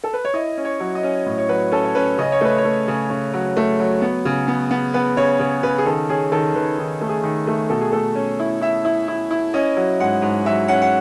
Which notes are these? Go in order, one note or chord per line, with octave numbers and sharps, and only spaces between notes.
A4
B4
C#5
E4 D#5
C#4
C#5
F#3
D#5
C#4
A2
C#5
F#3 B4
C#4 A4
C#5
C#4 B4
C#3 D#5
C#5
A3 B4
C#5
A3
C#3
C#3
F#3
A3
F#3
B3
C#3
B3
B3
B3 B4
C#3 C#5
C#3 C#5
C#3 B4
G#4
D#3 A4
C#4 G#4
D#3 A4
D#3 B4
D#3
A3
G#4
D#3
A3
B2 A4
G#4
A3 A4
C#4
E4
E4 E5
E4
E4
E4
C#4 D#5
F#3
G#2 F#5
G#2
F#3 E5
C#4 F#5
F#5